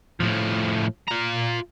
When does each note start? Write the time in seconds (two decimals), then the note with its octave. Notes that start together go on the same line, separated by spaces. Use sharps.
0.20 A2 F3
1.08 F4 A#5